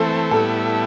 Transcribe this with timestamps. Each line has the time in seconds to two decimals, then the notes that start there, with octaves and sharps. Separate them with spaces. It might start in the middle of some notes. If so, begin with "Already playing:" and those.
Already playing: E3 A3 C4 A4
0.31 A2 G3 B3 E4 A4